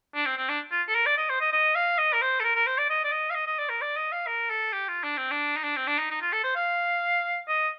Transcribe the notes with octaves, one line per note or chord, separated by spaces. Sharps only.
D4
C4
C4
D4
F4
A4
A#4
D5
D#5
C5
D#5
D#5
F5
D#5
A#4
C5
A4
A#4
A#4
C5
D5
D#5
D5
D#5
F5
D#5
D#5
D5
A#4
D5
D#5
F5
A#4
A4
G4
F4
D4
C4
D4
D#4
D4
C4
D4
D#4
D#4
F4
A4
C5
F5
D#5